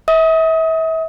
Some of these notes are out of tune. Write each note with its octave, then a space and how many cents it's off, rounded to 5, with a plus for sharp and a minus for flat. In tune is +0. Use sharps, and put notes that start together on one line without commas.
E5 -35 D#6 +25